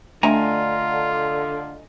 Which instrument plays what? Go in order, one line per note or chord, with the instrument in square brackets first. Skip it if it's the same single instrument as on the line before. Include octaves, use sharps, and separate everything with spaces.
[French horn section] D3 [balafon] A3 D4 E5 [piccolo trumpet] F4 [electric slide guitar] D#5 G#5 A#5